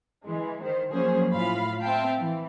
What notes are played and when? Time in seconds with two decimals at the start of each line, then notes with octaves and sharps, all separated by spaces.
0.24 E3 G#3
0.63 D#3 C5
0.92 F3 F#3 A#3 C#4 G#4 C5
1.33 A2 F4 F5 B5
1.82 C4 E5 F5 G5 A5
2.18 E3